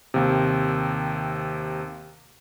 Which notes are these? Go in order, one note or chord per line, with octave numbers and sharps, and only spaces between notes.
D#2 C3